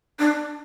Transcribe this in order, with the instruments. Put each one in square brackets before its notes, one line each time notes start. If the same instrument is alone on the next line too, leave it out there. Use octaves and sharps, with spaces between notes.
[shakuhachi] D4